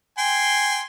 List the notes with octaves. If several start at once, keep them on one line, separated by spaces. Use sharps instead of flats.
G5 G#5 C6